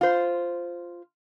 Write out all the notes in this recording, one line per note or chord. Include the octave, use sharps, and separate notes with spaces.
F4 C5